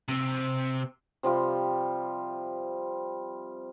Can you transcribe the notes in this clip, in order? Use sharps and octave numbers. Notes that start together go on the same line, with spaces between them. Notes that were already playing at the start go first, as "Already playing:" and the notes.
C3 C4
C3 F3 G3 F4